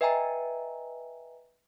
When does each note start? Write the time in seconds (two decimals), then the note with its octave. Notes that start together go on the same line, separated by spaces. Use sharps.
0.01 B4 D#5 E5 G5 G#5 A#5